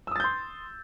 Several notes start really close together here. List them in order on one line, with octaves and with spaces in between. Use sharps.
E6 D#6 A6 G6 C6